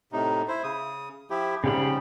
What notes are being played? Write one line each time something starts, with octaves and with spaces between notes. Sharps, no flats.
A2 C3 D#4
E4 C5
C#3 D#6
F3 E4 G4
G#2 C#3 F3 G3 G4 B5